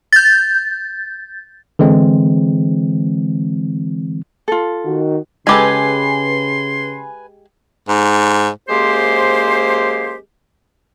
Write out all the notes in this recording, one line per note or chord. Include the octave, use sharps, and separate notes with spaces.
G6 A6
D3 E3 G#3 C4
F4 A4
D#3 F#4
C#3 G#3 G4 A4 B4 G#5 C6
G#2
F#2 G#3 A#3 G4 C5